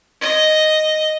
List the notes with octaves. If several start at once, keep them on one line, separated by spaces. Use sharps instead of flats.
D#5